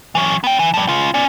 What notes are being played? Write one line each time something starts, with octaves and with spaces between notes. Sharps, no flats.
E3 F#3
B3 G5
E3
F3 G3
C#3 F4
C#4 D5